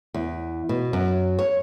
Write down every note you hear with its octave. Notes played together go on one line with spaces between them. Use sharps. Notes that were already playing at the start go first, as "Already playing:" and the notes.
E2
B2
F#2
C#5